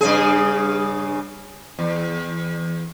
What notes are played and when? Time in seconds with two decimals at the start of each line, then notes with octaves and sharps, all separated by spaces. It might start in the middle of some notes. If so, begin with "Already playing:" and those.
0.01 G2 C#3 G#4
1.79 E2